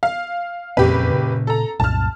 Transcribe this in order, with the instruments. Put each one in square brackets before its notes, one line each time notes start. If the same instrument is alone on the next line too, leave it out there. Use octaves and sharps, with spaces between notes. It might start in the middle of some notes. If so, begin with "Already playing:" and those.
[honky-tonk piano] F5
[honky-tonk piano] F#1 G4 B4 [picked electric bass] F2 A#2 C4
[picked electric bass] A#2 C#3
[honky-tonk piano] A4 A#5
[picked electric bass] C2 F#2 A#2 [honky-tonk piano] A5 F6